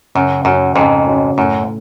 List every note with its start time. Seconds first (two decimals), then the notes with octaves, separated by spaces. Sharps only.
0.15 F#2 C#3
0.45 F#2 F#3 C#4 F#4
0.75 F2 G#2 C#3
1.07 F#3 C#4 F#4
1.38 F#2 A2